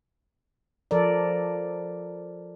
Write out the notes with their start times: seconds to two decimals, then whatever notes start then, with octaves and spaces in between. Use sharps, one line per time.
0.91 F3 A4 A#4 D5